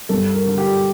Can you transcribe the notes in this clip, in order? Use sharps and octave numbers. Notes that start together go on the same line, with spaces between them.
G2 A4
A#4
D3
G4